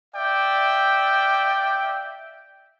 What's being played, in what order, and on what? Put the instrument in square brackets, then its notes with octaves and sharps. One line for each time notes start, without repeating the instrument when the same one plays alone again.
[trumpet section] D5 E5 F5 G5